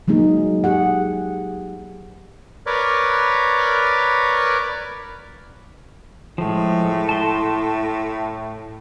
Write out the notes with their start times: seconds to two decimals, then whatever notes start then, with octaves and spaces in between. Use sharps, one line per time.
0.08 F#3 G#3 A#3 D#4 G#4
0.64 G4 G#4 F#5
2.66 A#4 B4 C#5 D5
6.38 A2 F3 G#3
7.09 A5 C6